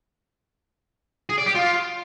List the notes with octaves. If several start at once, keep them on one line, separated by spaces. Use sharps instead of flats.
G#4
D5
G4
F4